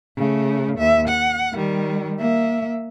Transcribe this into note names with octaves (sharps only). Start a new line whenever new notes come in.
C#3 A3
D#2 E5
F#5
D#3 G3
A#3 E5